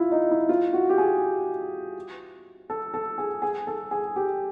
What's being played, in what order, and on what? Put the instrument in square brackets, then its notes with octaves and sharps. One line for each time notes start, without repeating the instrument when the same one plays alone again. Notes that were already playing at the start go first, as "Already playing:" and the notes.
Already playing: [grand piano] E4 F4
D#4
E4
F4
F#4
G4
G#4
A4
A4
G#4
G#4
A4
G#4
G4